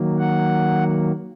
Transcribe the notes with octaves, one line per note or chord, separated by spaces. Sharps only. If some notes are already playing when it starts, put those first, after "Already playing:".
Already playing: D#3 F#3 A#3
F#5